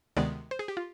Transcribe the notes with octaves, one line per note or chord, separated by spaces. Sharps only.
D2 C3 D#3 G#3 B3 D5
C5
G#4
G4
F4